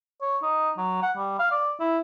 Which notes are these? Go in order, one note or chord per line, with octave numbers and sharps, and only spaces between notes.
C#5
D#4
F#3
F#5
G3
F5
D5
E4